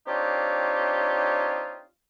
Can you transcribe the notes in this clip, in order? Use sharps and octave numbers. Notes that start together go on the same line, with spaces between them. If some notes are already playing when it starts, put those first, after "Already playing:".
C4 D4 D#4 F4 G4 C#5